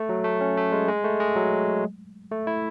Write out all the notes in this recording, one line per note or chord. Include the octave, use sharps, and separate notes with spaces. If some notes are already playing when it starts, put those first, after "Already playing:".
Already playing: A3
F#3
A3
C#4
A3
G#3
G#3
A3
G#3
F#3
A3
E4